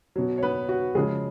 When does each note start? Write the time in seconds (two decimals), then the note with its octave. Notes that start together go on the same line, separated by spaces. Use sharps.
0.16 B2 F#3
0.38 C#5
0.43 B3 B4
0.69 F#4
0.95 C#3 F3 G#3 G#4